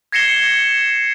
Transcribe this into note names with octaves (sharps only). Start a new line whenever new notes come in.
G#6 A#6 C7 C#7 E7 G7